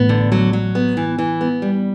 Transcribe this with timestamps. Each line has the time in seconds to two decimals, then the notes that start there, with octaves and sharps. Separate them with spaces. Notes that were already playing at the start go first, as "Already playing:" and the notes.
Already playing: A1 A2 B3
0.09 D3
0.32 F#3
0.53 F#3
0.75 B3
0.97 E3
1.19 E3
1.41 B3
1.62 G3